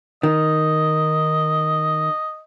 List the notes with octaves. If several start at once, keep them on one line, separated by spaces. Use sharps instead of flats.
D#3 D#5